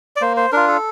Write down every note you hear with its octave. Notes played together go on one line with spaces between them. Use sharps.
D5
A#3 C5
C5
D4 F4 A#4
A4